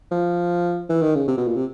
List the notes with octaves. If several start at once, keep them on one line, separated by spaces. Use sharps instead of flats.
F3
E3
D#3
C#3
C3
B2
A#2
C3